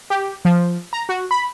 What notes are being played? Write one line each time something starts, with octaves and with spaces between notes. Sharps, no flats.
G4
F3
A#5
F#4
B5